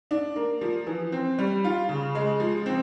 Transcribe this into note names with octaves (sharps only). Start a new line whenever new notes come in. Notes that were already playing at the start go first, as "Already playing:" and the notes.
D4
A#3
F3
E3
C4
G3
F4
C#3
G#3
F3
C4